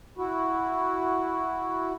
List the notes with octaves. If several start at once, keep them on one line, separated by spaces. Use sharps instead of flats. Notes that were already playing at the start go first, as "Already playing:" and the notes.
E4 F#4